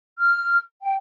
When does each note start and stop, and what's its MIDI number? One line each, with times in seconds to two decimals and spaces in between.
0.19 0.59 89
0.83 0.95 79